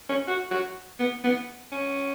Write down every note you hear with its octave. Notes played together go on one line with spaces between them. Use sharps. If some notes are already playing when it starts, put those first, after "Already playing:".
C#4
F#4
F#4
B3
B3
C#4